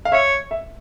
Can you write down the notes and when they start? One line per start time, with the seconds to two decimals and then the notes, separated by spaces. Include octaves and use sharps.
0.05 F5
0.12 C#5 E5
0.51 E5